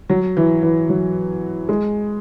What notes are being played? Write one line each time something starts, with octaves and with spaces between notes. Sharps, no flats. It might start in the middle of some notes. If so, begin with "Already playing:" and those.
F#3
E3
E3
F#3
G#3